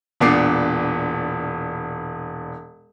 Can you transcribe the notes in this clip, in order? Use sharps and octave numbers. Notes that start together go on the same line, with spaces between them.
E1 A#2 B3 D4 D6 C7